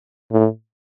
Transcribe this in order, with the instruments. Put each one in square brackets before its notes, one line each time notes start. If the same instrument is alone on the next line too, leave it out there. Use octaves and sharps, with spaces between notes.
[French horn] A2